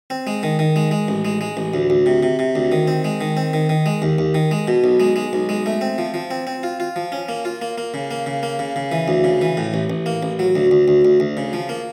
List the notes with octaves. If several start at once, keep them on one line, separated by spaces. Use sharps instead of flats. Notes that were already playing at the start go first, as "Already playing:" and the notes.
C4
G#3
D#3
D#3
G#3
G#3
A1
G#3
G#3
A1
D2
D2
C3
C3
C3
D2
D#3
C4
G#3
D#3
C4
D#3
D#3
G#3
D#2
D#2
D#3
G#3
B2
B1
G#3
G#3
B1
G#3
A3
C4
F3
F3
C4
C4
F4
F4
F3
C#4
A#3
F4
A#3
A#3
C#3
A#3
C#3
A#3
C#3
C#3
E3
D2
C#3
E3
A2
A1
A1
A#3
A1
F#3
D2
D2
D2
D2
D2
C#3
F3
A#3